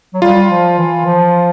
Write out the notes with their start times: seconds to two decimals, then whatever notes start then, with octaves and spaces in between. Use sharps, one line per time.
0.14 F#3
0.22 G3 F4
0.51 F3
0.78 E3
1.06 F3